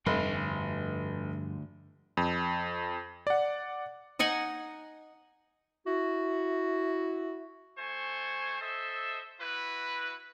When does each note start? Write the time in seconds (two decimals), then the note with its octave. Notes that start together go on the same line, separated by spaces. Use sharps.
0.06 F1 D2 G2 F3 G3 C6
2.17 F2
3.27 D5 F#5
4.19 D#4 D#5 F#5 G#5
5.87 E4 F#4
7.78 A3 C5 G#5 C#6
8.60 A4 C5 D#5 E5
9.40 E4 F#4 B4